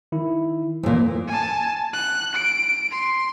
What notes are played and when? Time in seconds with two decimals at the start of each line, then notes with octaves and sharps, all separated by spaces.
0.12 D#3 E4
0.83 D2 A#2 E3
1.28 G#5 A5
1.94 F#6
2.35 D7
2.91 C6